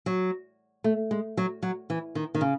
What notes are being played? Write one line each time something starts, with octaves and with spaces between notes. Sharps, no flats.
F#3
A3
G#3
F#3
F#3
E3
D#3
D#3
C#3